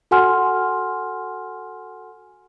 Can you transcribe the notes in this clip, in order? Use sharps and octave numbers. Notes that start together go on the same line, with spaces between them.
F#4 A4 F#5 G#5 C6 F6